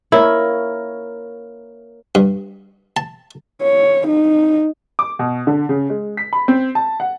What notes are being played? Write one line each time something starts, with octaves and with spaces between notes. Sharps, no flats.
A#3 E4 A#4 C#5
G2
A5
C#5
D#4
D6
B2
D3
C#3
G#3
B6
B5
C4
A5
F#5